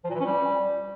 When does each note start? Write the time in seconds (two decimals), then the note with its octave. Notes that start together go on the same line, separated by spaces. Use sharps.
0.04 F3
0.10 A#2
0.15 E3
0.20 C#4
0.25 G3